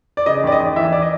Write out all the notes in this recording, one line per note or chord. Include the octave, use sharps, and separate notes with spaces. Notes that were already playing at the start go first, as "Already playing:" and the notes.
D5
C#3 D#5
D#2 D5
D#5
D#2
E3 E5
D5
D#5